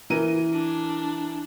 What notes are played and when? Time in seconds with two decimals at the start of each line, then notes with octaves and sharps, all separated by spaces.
0.10 E3 A#4 D#7
0.53 D4